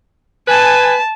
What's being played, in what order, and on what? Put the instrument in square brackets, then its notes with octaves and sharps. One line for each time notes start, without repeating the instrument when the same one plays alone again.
[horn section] B4 G#5 [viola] A5